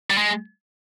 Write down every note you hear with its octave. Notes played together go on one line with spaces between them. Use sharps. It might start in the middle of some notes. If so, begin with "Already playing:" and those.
G3
G#3